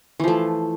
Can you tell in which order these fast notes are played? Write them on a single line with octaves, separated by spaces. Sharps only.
E3 F3 A3